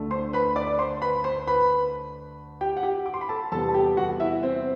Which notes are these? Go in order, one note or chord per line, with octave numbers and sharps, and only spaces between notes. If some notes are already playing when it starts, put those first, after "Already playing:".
Already playing: D2 D3 A3
C5 C6
B4 B5
D5 D6
C5 C6
B4 B5
C5 C6
B4 B5
G4 G5
F#5
G4 G5
D6
C6
B5
A4 A5
E2 C3 G3 B3 A4 A5
A5
G4 G5
F#4 F#5
E4 E5
C4 C5